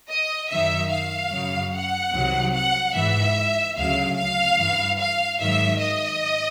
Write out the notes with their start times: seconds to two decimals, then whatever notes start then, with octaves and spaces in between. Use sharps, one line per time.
0.10 D#5
0.50 F#2 D#3 F#3 E5
0.90 F5
1.31 F#2 C#3 F#3
1.73 F#5
2.13 C2 C3 D#3 F#3
2.53 F#5
2.95 G#2 E3 E5
3.76 D2 C#3 F#3 F5
4.17 F5
4.57 G2 E3
4.98 F5
5.39 G#2 D#3 F#3 E5
5.80 D#5